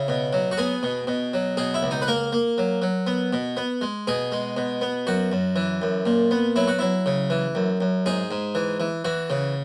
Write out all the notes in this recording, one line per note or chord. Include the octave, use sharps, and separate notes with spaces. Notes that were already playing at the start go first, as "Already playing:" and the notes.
Already playing: C#3 E4
B2
F#3
F#4
B3 G#4
B2
B2
F#3
B2 G#4
E4
C#2
D#4
B4
A#3 A#4
A#3
F#3
F#3
B3
B2
B3
G#3
B2 G#4
G#3
B2
B3
F#2 F#4
F#2
E3
F#2
A#2
B3
F#3 E4
F#4
F#3 E4
C#3
E3
F#2
F#2
G#2 G#4
G#2
E3
E3
E3 F#4
C#3